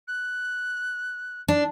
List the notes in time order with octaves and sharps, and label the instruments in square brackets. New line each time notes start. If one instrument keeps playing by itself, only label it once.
[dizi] F#6
[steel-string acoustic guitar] D4